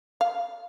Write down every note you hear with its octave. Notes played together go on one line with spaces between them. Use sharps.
F5